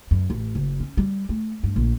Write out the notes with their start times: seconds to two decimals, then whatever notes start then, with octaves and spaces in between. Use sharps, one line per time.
0.11 F#2
0.30 A1
0.55 F#1
0.80 C#4
0.97 G3
1.29 A3
1.64 G2
1.76 A#1